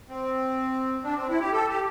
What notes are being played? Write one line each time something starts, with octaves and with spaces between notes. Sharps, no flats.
C4
D4
C4
E4
G4
A4
G4